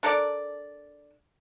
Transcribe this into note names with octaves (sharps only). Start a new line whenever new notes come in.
D4 A4 A#4 D5